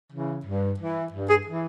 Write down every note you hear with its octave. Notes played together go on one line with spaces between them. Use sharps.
C#3 E3
G2
E3
G2
G#4
E3